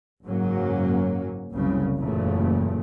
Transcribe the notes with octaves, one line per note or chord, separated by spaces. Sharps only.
F#1 G#2 F#3 A#3 C#4
F#1 C2 C#3
F#1 E2 A#2 C#3 A3